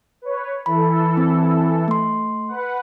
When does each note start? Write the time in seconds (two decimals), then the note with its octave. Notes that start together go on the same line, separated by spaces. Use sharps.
0.22 B4 C#5
0.66 E3 E4 A4 B5
1.17 C4
1.88 A3 C6
2.48 B4 F#5